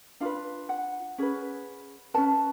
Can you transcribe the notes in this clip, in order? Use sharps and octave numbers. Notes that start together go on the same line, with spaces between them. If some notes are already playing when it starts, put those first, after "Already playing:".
D4 F4 B4 F5
F#5
C#4 G#4 B4
C#4 G#4 B4 A5